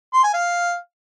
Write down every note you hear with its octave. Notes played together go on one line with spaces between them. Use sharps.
C6
G#5
F5